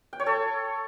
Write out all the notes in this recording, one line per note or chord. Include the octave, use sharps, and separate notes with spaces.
G5
C#5
A4